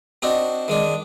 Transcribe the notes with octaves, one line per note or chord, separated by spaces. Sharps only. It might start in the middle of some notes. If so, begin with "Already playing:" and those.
C4 D4 D#4 F#4
D#3 G#3 D4